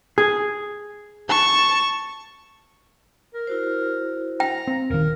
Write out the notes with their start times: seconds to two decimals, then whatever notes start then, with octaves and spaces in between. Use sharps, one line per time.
0.18 G#4
1.29 A5 C#6
3.34 A#4
3.47 E4 F#4 C5
4.40 G5 A#5
4.67 C4 F5
4.90 D#1 D#3 A#4